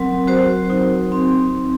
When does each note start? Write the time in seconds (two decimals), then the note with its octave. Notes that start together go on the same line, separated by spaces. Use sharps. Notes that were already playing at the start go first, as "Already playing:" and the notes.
Already playing: F#3 C4 A#4
0.27 F#4 C5
0.70 D#4
1.12 C4